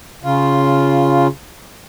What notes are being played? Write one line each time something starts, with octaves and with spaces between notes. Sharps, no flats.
C#3 F4